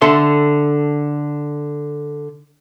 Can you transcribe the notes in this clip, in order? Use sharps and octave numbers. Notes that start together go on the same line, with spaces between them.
D3 A4 E5 C6